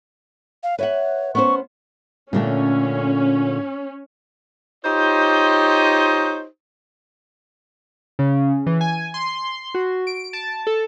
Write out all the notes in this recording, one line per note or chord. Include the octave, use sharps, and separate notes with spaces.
F5
B4 C#5 E5 F#5
B3 C#4 C5 C#6
A#2 D3 A3 C#4
D#4 F4 G4 C5 C#5 D#5
C#3
E3
G#5
C6
F#4
D7
A5
A4